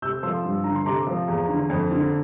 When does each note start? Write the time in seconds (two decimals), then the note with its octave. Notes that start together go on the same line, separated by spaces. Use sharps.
0.02 C3 E6 G6
0.23 F3 C6 E6
0.44 G2
0.64 D3 A#5
0.75 C6
0.86 C3 A#5 D6
1.07 F3
1.28 E2
1.49 D3
1.70 F2
1.91 D3